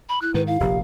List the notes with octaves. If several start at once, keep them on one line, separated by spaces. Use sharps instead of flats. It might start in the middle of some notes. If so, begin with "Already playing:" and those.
B5
E4 F#6
G#2 D#3 B4
E4 F5
F1 A#1 F2 G4